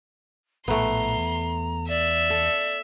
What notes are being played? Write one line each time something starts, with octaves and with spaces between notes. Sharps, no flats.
A#1 A2 A3 B3 A#5 C6
E2
D5 E5
A4